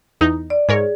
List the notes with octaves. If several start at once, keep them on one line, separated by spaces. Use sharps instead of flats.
E2 D#4
D5
G#2 G#4 A#4 C#5